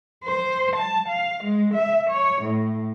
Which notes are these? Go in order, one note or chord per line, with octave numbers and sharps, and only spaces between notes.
C5
A5
F5
G#3
E5
C#5
A2